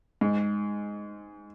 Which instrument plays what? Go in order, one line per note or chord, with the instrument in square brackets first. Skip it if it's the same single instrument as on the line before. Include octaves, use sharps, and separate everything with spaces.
[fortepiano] G#2